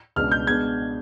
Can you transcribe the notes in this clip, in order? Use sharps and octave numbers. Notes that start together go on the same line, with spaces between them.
C#2 B2 G#3 B3 D4 F6
G6
B2 G#3 B3 D4 G#6